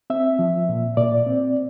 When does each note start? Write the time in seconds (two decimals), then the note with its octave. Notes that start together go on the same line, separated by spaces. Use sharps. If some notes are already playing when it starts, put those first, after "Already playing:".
0.10 C4 E5
0.39 F3
0.69 A#2
0.97 A#2 D5
1.26 C4